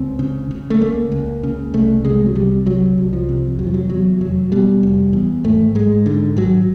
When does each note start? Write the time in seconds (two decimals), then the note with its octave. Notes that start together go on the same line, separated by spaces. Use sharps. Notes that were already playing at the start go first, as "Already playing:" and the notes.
Already playing: C#2 C4
0.19 C#3
0.51 C#3
0.70 A3
0.81 C#2 A#3
1.12 C#2
1.43 C#3
1.74 C2 A3
2.05 C3 G#3
2.26 F#3
2.35 C3 G3
2.66 C2 F#3
2.98 C2
3.13 F3
3.29 C3
3.59 F1 F#3
3.67 F3
3.74 F#3
3.90 E2 F#3
4.21 F1 F#3
4.52 B2 G3
4.83 F1
5.13 E2
5.44 G#1 A3
5.75 G#2 G#3
6.06 G#2 D3
6.37 G#1 F#3